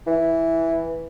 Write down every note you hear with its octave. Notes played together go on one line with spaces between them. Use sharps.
E3